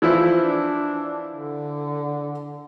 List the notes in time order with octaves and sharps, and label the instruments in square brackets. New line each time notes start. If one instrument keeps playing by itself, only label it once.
[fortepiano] E3 F3 E4
[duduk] D4
D3